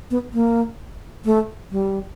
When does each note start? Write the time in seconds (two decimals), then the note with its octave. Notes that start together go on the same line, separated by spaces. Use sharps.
0.11 B3
0.34 A#3
1.25 A3
1.71 G3